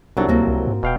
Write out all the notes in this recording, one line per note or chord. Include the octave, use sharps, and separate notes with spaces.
C2 F#3 B3 D4 D#4 A4
D2 A#3 C4 F#4
C#2
G#2
D#1 B2 F5 G5